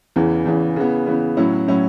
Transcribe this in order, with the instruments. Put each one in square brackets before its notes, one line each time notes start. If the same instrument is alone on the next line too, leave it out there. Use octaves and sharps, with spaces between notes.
[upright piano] E2 C#3 E3
E2 C#3 E3
C#3 E3 B3
C#3 E3 B3
A2 F#3 C#4 E4
A2 F#3 C#4 E4